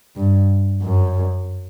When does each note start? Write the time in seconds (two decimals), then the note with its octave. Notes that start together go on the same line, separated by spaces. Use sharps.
0.16 G2
0.83 F#2